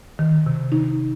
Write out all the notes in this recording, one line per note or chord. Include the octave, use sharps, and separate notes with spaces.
D#3
C3
D#4